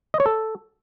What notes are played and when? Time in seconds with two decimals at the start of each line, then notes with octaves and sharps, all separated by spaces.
0.14 D#5
0.20 C#5
0.26 A4